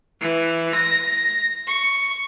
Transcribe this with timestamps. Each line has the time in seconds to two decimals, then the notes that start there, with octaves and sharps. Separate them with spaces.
0.22 E3
0.75 A#6
1.67 C#6